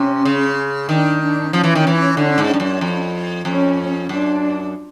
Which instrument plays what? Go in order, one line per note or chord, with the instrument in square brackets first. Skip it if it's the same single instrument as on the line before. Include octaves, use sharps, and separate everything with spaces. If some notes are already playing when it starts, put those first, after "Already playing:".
Already playing: [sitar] C3 [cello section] C#4
[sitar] C#3
[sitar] D#3 [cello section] D4
[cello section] D4
[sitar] F3 [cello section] C#4
[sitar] E3
D#3
E3
D3
G#2
G2
F#2
F2
[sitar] F2 [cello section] C#4
[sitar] F#2 [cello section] D4